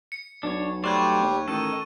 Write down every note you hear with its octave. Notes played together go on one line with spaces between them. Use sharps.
C#7
B1 D4 C#5
G3 A3 C5 D5 C#6 F#6 G#6
D#2
A1 D#3 A4 D#7